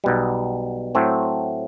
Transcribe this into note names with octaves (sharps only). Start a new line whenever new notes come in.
B1 B2 G3
A2 F#3 A3 C4